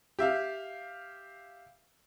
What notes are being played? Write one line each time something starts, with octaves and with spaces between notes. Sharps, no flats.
G4 E5 F5